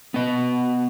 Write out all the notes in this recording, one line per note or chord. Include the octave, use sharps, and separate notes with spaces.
B3 D#5